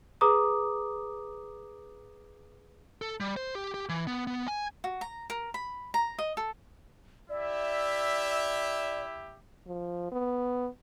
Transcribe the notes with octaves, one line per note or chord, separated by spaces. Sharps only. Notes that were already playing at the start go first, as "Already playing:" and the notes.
G#4 B4 A#5 D6 D#6
A4
G3
C5
G4
G4
E3
B3
B3
G#5
F#4
A#5
A#4
B5
A#5
D#5
A4
E4 G4 D5 E5
F3
B3